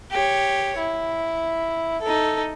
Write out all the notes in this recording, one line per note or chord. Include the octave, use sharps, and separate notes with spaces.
G4 C#5
E4
D#4 A4